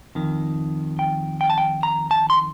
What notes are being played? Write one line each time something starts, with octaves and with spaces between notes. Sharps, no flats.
F2 D#3
G5
G5
A5
G5
A#5
A5
C6